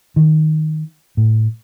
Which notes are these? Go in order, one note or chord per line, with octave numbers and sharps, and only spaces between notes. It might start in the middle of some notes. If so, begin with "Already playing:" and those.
D#3
A2